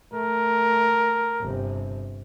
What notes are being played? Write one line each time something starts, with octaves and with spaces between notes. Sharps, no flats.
A3 A#4
G1 C3